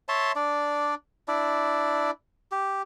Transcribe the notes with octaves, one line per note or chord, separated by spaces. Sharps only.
C#5 E5 A5 C6
D4 D5
D4 E4 D5
G4